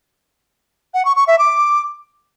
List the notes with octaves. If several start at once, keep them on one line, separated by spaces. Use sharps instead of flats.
F#5
C#6
C#6
E5
D6